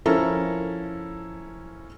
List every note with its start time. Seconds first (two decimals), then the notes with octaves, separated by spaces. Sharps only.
0.06 F3 C#4 E4 A4 A#4